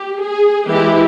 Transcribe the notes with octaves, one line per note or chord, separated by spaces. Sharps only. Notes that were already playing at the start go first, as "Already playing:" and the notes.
Already playing: G4
G#4
E3 G#3 E4 G4